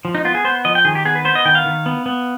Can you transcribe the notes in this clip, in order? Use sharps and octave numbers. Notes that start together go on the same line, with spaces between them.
F3
D#4
B3 F4
G#4
B3 C5
F3 D#5
G5
D#3 G#4
G4
B3 G#4
B4
B3 C5
D#5
D#3 G5
F5
D#3
B3
B3